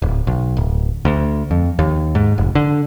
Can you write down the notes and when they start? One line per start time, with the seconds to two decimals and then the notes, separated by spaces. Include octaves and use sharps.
0.02 D1
0.27 B1
0.57 D1
1.05 D2
1.51 F2
1.79 D#2
2.15 G#2
2.38 F1
2.55 D3